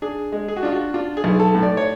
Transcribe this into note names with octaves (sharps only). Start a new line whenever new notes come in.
D4 G#4
G#3
G#4
F#4
D4 F4
F#4
D4 F4
G#4
B1
A4
A2
D5
C#5